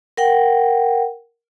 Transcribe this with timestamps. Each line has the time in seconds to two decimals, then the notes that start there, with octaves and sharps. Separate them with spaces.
0.17 A#4 F#5 G5